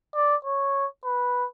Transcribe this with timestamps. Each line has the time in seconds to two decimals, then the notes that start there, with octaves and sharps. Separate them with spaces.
0.15 D5
0.45 C#5
1.04 B4